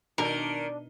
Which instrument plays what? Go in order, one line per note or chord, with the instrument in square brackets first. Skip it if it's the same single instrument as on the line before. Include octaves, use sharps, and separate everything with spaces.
[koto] B2 [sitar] D#3 [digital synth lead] D4 [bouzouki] A#4